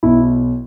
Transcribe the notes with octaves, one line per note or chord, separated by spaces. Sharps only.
B1 E4